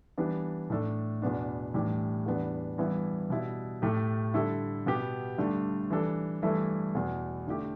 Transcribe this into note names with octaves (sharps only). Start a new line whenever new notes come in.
E3 G3 B3 D4
A2 A3 D4 A4
E2 B2 B3 D4
A2 E3 G3 D4 G4
E2 E3 G3 B3 D4
G2 E3 B3 E4
B2 G3 E4
A2 A3 G4
D3 G3 E4 A4
B2 B3 G4
G2 D3 A3
E3 G3 D4 A4
G2 E3 A3 E4 A4
E2 B2 B3
D3 A3 E4 G4